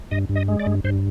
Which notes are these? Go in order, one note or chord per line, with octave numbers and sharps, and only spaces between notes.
G2 D#5
G2
D#5
G#3
D5
G2
G2 C5